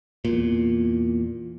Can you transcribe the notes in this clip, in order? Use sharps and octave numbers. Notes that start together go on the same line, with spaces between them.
E2 A#2